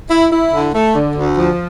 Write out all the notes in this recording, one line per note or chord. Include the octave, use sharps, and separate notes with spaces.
E4
E4
D3
A3
D3
D2
F3